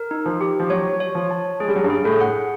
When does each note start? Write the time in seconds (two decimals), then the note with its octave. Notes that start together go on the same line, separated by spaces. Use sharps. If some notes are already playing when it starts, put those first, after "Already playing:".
Already playing: A#4
0.11 D#4
0.26 F3
0.41 G4
0.60 F3
0.70 F#3 C#5
1.00 C#5
1.15 F3
1.31 A5
1.60 G#3 G#4
1.68 G3
1.76 F#3
1.83 G2 G3
1.90 G#4
2.04 A2 A3
2.20 F#5